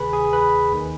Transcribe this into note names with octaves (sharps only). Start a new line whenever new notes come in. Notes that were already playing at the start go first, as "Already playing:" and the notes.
Already playing: D2 C3 D#3 G#4 B4 G#5 B5
G#4 G#5
B4 B5
D#2 D#3